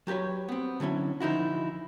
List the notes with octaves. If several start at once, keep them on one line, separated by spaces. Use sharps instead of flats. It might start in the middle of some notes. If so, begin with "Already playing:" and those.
F#3 G4 A4 B4 C#5
B3 C4
D3 F#3 C#4 E4
D3 F3 D#4 E4 F#4